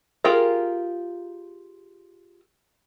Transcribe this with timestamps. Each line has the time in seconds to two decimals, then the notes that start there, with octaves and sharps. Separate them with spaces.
0.24 F4 G4 G#4 A#4 F5